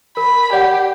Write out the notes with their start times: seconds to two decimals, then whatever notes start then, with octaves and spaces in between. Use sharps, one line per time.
0.17 A#4 B5
0.53 G4 D5 F#5